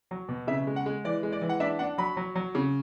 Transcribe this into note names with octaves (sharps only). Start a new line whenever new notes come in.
F#3
B2
C#3 E5
G#3
F#5
G#3
E3 D5
G#3
D5
E3
F#5
D4 E5
D4 F#5
F#3 B5
F#3
F#3
C#3